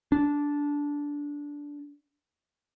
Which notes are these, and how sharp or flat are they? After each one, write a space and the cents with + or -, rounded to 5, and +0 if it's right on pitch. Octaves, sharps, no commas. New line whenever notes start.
D4 -15